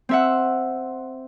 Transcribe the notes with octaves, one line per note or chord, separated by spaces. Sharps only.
C4 E5 F#5